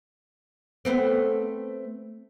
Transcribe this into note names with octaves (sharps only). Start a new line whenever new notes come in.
A3 B3 C4